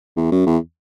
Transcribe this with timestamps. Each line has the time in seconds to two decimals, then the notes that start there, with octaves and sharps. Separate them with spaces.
0.16 E2
0.32 F#2
0.46 E2